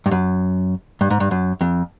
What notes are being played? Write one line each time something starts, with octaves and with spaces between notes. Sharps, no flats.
G2
F#2
G2
G#2
G2
F#2
F2